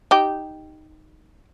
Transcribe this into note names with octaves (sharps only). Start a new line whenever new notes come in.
D#4 G4